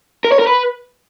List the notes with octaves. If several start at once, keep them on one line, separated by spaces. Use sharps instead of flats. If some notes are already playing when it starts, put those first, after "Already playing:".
A#4
C#5
A#4
B4